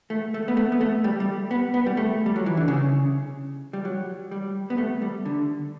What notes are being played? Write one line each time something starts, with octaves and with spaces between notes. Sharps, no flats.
A3
A3
B3
A3
B3
A3
G3
G3
B3
B3
G3
A3
G3
F#3
E3
D3
C#3
G3
F#3
G3
B3
A3
G3
D3